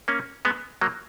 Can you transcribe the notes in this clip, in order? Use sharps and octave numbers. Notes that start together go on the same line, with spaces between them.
A#3 C#4
G#3 B3
F#3 A#3